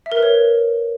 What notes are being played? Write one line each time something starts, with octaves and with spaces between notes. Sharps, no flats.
E5
A#4
B4
C#5